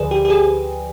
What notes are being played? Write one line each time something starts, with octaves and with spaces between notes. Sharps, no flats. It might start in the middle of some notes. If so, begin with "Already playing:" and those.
Already playing: D2 D3 F3 G#4 B4 C5 D5
G4
G4
G#4